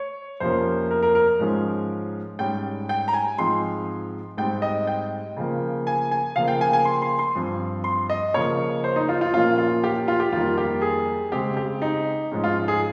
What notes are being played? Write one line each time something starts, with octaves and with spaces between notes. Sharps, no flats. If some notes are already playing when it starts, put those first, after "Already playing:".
Already playing: C#5
F2 C3 F3 A#3 C#4 C5
A#4
A#4
A#4
G#2 F3 G#3 C#4
G#2 G3 C#4 G5
G5
A#5
G#5
G#2 F3 G#3 C4 C6
G#2 G3 C4 G5
D#5
G5
C#3 F3 A#3
G#5
G#5
C#3 F3 A#3 F5
G5
G#5
G#5
C6
C6
C6
G2 F3 C4
C6
D#5
C#3 F3 A#3 C#4 C#5
C5
D#4
F4
F4
A#2 F3 A#3 C#4 F4
F4
G4
F4
G4
F2 D#3 G3 A#3 F4
G4
G#4
C#3 G#3 C4 G4
G4
D#4
G#2 F3 G#3 C#4
F4
G#4